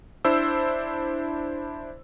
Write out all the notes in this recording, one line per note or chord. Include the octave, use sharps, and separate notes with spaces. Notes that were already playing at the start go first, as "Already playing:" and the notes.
D4 E4 C5 E6